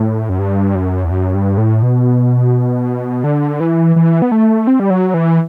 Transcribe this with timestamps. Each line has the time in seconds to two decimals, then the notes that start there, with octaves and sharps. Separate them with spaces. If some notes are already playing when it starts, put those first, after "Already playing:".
Already playing: A2
0.29 F#2
0.39 G2
0.75 F#2
1.04 E2
1.10 F#2
1.35 G2
1.58 A2
1.82 B2
3.24 D3
3.60 E3
3.96 E3
4.22 B3
4.32 A3
4.67 C4
4.80 G3
4.90 F#3
5.14 E3